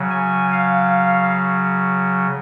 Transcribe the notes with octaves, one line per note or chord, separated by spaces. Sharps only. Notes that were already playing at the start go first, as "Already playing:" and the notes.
Already playing: C#3 F#3
G#5
F5